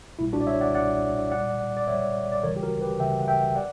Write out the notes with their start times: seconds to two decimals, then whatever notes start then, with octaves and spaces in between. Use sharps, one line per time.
0.19 B1 A#2 G3 E4
0.33 D4 F#4
0.41 D5
0.47 C#5 E5
0.61 D5 F#5
0.75 B1 A#2 G3 D5 F#5
1.31 A#1 A#2 G3 D5 F#5
1.77 D5
1.87 A#1 A#2 G3 C#5 E5
2.32 D5
2.43 D2 C#3 E3 G3 A#4 C#5
2.56 G4
2.63 F#4 A#4
2.81 G4 B4
3.00 D2 C#3 E3 G3 E5 G5
3.21 F#5
3.28 E5 G5
3.56 D5 F#5